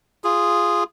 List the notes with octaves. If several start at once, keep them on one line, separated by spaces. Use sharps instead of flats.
F4 G#4